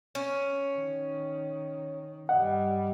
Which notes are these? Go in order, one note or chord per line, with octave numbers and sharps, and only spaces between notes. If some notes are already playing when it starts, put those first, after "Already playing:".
C#4
D#3
G2 G3 D#5 F#5